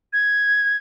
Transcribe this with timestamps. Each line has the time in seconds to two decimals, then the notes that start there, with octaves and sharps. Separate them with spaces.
0.13 G#6